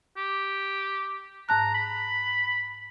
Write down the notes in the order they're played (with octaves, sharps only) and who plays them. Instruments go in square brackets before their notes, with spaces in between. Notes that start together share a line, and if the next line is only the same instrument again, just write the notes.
[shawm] G4
[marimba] G#2 A5 F#6 [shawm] A#5
[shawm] B5